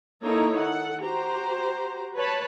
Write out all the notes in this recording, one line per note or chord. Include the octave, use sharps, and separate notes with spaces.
A#3 D#4 E4 A4 C#5 A#5
D#3 A4 F#5
F#4 G4 C5 A#5
B4 C#5 A5 B5